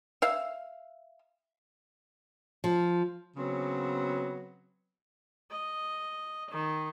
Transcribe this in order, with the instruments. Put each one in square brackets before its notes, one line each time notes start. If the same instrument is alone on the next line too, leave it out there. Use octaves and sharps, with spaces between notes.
[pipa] E5 F5
[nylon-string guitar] F3
[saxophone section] C#3 F#3 B3 C4
[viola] D#5
D#3